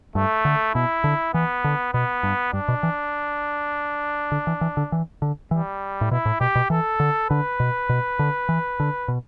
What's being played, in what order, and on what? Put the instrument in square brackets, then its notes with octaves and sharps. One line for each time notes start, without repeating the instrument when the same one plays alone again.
[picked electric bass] G2 [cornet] A3
[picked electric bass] D3
[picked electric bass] B2 [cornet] E4
[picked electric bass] D3
[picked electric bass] E3 [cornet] B3
[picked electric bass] D3
[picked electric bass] B2 [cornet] B3
[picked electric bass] G2
[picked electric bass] G2 [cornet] D4
[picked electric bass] B2
E3
D3
E3
E3
D3
E3
D3
[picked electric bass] E3 [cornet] G3
[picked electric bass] A2
[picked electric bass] B2 [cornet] E4
[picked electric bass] A2
[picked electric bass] B2 [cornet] G4
[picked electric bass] B2
[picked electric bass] E3 [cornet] A4
[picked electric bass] D3
[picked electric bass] D3 [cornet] B4
[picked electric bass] B2
B2
D3
E3
D3
B2